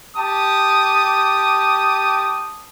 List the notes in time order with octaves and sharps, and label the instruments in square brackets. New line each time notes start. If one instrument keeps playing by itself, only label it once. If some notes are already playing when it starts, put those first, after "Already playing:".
[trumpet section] G4 A5 D#6